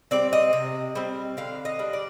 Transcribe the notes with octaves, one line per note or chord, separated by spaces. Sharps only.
G3 C4 D5
D#5
C3
G3 C4
D3 F5
D#5
G3 D4
D5